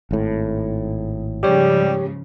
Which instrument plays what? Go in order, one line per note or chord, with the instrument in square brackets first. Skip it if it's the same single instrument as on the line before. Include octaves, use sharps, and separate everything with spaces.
[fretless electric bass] G#1 A2
[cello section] G#2 C#3 F3 [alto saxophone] G3 [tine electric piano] G4 C#5